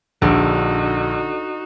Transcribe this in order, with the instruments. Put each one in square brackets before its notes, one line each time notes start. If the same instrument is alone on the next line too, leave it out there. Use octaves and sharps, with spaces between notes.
[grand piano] A#1 [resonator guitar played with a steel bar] D3 [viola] D#4 F#4